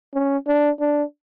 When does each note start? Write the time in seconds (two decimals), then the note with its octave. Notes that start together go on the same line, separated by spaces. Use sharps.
0.14 C#4
0.47 D4
0.80 D4